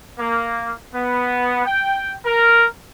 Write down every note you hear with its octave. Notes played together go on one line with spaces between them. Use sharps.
A#3
B3
G5
A#4